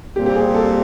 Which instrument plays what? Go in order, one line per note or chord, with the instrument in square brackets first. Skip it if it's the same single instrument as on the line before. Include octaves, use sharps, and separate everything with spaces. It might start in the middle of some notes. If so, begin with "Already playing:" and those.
[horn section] A#2 G3 C4 [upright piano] G4
[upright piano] G4
G#4
A4